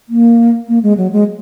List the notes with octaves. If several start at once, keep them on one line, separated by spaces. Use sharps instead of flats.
A#3
A#3
G#3
F#3
G#3